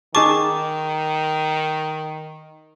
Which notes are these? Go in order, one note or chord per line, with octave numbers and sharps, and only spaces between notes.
D#3 D#4 G#4 A5 C#6 D6